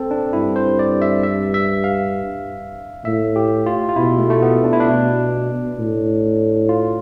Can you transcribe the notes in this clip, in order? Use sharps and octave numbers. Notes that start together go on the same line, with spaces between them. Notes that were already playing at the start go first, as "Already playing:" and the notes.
Already playing: C4 A4
D4
G2 E4
C5
D5
E5
E5
E5
F5
A2 E5
G4
F4
F4
B2 E4
A3
A3
B3
D4
E4
D4
B2
A2
F4